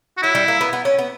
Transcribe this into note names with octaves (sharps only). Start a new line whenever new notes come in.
F#4
F#3 E4
G3
A#3
B3
B3
C#4
B3